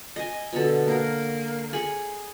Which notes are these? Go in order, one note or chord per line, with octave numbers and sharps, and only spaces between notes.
D#5 G#5
B2 D3 A4
A#3 A#4
G#4 B5 C#6